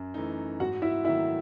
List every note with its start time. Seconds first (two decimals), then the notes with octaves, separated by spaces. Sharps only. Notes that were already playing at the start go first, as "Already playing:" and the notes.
Already playing: F#2
0.14 E3 A3 D#4
0.60 G#2 F#4 F#5
0.82 E4 E5
1.05 D#3 F#3 A3 E4 E5